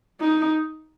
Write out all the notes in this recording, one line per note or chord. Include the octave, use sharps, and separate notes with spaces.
D#4